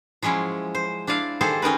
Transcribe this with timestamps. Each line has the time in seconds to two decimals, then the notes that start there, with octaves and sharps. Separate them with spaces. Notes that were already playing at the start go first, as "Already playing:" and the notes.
0.22 F3 F#3 G#3 C#4 E4
0.75 C5
1.07 D4 E4 D5 F5
1.41 D#3 G3 G#4 A4 C5
1.62 C#4 D#4 A#4 B4